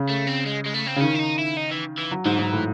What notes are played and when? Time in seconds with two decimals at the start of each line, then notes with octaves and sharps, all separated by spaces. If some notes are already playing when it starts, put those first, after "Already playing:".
Already playing: C#3
0.09 A3
0.27 C4
0.46 G#3
0.66 G#3
0.74 A3
0.87 C4
0.96 C#3
1.01 D#3 C#4
1.15 E4
1.19 D#4
1.38 E4
1.57 D#4
1.71 E3
1.98 E3
2.11 F#3
2.25 G#2 E3
2.39 G#2
2.52 A2